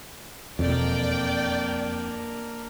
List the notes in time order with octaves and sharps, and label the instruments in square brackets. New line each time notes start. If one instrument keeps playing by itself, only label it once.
[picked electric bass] E1 [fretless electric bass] F2 [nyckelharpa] A#3 D4 [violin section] D5 G5